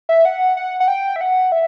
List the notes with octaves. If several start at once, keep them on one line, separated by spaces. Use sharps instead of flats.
E5
F#5
F#5
F#5
G5
E5
F#5
E5